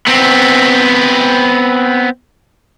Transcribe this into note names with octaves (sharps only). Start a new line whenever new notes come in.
B3 C4